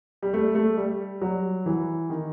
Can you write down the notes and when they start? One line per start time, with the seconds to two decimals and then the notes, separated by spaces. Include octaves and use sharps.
0.22 G3
0.34 A3
0.55 A3
0.77 G3
1.21 F#3
1.66 E3
2.10 D#3